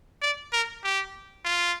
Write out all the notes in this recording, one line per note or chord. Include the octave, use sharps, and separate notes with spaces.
D5
A#4
G4
F4